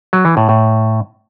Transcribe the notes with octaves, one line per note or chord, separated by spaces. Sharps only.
F#3
E3
A2
A2